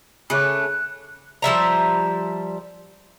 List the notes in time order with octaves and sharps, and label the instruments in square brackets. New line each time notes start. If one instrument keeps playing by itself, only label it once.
[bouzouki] C#3 A3 [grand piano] G#4 C#5 D6 [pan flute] F#6
[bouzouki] F3 G3 E5 A#5